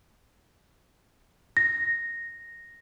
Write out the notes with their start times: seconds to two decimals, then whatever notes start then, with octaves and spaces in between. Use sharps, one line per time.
1.57 A#6